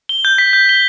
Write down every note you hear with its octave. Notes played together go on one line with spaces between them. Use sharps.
G7
G6
B6
G6
G7